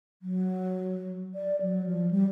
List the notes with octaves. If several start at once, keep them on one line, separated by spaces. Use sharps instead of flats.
F#3
D5
F#3
F3
G3